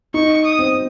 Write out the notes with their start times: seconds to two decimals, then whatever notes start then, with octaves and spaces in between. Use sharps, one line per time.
0.14 D#4 C#6
0.44 D#6
0.59 C4